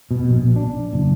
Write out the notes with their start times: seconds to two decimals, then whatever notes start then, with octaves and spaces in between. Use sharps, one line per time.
0.11 B2
0.29 A#1
0.56 D4
0.93 F#1